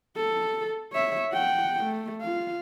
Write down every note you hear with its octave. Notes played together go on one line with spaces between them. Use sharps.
A4
C#5 E5
F#5 G5
A3
F4 F5